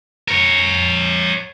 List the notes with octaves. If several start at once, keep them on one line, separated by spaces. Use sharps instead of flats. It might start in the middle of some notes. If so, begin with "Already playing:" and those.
A#4 C#5